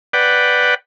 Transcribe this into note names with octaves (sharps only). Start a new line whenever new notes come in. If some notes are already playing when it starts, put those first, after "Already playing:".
B4 D5 F#5 G5